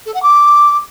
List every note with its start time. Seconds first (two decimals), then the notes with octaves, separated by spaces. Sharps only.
0.06 A4
0.14 F#5
0.23 D6